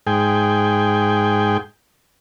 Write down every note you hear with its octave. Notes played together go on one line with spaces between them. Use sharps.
G#2 G#4 G5